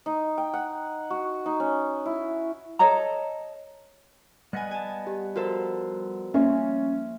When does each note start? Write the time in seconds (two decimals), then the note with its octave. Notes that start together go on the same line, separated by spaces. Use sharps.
0.06 D#4
0.38 G5
0.54 F#5
1.10 F#4
1.46 D#4
1.60 C#4
2.06 E4
2.79 A4 C#5 D#5 A#5
4.53 G3 B3 D#5 F#5 G#5
4.71 G#5 A5
5.07 G4
5.36 F3 F4 F#4 A4 A#4 C5
6.34 F3 A#3 C#4 E5